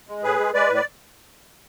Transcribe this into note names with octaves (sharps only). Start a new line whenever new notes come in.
G#3
A2 G#4 B4
G#3
G#3 B4 D5
A2
D5